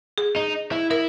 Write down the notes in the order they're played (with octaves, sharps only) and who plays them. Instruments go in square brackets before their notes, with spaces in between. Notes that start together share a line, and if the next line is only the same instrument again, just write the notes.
[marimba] G#4
[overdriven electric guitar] D#4
E4
[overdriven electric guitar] E4 [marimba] A#4